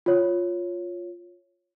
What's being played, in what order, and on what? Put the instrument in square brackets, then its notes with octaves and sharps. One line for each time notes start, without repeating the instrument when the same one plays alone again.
[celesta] F4 C#5